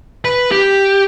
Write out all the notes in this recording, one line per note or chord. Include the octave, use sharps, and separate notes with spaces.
B4
G4